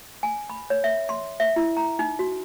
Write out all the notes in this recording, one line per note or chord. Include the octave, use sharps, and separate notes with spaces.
G#5
B5
C#5
E5
C6
E5
E4
A#5
D#4
F#4